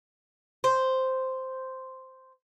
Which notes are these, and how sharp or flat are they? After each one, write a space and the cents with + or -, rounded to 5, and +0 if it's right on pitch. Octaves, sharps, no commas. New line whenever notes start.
C5 -5